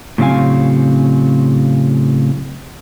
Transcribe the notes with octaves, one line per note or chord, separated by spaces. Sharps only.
A2 C#3 F#3 C4 F5 G#5